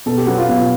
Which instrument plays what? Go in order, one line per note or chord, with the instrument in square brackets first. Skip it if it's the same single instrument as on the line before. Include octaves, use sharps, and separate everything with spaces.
[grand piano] B2 [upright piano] A4
[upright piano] G4
[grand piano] F#3 B3 [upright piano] F#4
[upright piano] F4
[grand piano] B2 [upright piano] F4